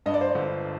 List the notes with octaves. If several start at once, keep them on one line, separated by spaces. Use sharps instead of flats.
G2 D#5
D5
C5
D5
G1